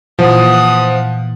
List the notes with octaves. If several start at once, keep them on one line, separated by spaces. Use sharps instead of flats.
A#2 E3 F3 F#5 D#6